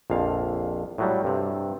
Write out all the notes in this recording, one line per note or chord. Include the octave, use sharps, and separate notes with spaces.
A#1 F2 F5
A2 F#3 G3
G2 C3